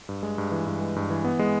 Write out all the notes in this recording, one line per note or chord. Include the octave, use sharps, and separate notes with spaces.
G2
G#3
G2
E3
G2
G#3
G2
E3
B3
G#3